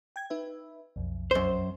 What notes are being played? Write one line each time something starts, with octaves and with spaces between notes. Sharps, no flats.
G5 G#6
D#4 B4 E5
B1 F2
F#2 C5